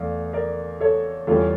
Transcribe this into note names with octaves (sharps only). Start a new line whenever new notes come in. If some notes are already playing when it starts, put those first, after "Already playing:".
Already playing: E2 E3 A3 D5 F5
A#4 D5
A4 C#5
E2 E3 G3 C#4 F4 A4